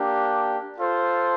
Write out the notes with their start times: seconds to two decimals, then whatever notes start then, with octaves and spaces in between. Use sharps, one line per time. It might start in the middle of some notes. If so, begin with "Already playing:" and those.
Already playing: A#3 D4 G4
0.77 F4 A4 C5